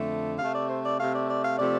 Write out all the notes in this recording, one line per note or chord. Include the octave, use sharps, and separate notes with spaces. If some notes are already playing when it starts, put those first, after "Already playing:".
Already playing: F2 D3 A3
C3 A3 F5
D5
C5
D5
C3 A3 F5
D5
D5
F5
C3 F3 A3 D5